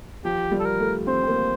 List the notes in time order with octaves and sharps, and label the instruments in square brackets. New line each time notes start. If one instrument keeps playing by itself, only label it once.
[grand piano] F3 [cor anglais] G4
[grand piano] G3
[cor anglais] A4
A#4
[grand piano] A3
[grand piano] C4 [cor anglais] C5
[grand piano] C4
A#3